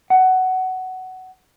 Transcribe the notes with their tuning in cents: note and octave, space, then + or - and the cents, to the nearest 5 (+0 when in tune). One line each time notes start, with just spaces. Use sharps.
F#5 +15